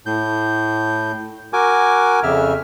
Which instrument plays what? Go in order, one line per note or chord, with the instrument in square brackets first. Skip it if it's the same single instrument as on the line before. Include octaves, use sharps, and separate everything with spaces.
[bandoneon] A2 G6
F#4 A#4 G#5 D6
F2 C#3 E5 F6